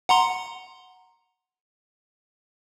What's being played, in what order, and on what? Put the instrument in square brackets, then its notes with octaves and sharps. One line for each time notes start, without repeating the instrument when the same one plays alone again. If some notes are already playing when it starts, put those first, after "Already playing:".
[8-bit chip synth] F#5 A#5 C6